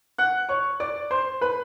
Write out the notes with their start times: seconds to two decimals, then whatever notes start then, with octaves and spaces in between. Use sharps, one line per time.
0.18 F#5 F#6
0.49 C#5 C#6
0.80 D5 D6
1.11 C5 C6
1.41 B4 B5